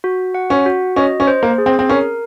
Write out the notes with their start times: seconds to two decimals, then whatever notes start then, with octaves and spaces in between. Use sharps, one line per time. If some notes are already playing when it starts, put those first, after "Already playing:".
0.04 F#4
0.35 F#5
0.50 C#4
0.66 F#4
0.96 C#4 D#5
1.20 C#4
1.27 C5
1.43 A#3
1.58 G#4
1.66 C4
1.79 C4
1.89 C#4 A#4